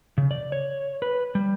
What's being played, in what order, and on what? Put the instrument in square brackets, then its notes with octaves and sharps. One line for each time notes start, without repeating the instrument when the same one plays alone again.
[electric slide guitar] C#3
D5
C#5
B4
G3